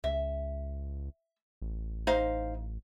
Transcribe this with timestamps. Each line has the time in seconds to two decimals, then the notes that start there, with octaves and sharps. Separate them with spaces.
0.04 C#2 E5
1.61 A1
2.07 D#4 C5 F5